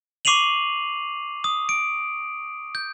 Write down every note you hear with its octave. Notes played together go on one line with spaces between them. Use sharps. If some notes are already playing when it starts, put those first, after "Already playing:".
C#6 D6 C7 D#7 F7 F#7
D#6
D7
G6